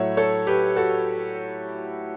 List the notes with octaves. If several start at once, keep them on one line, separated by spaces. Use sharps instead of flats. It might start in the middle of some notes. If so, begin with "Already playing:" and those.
Already playing: A2 F#3 A3 C#5 E5 F#5
A4 C#5
G4 B4
F#4 A4